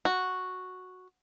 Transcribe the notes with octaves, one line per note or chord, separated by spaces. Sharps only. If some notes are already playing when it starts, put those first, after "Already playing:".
F#4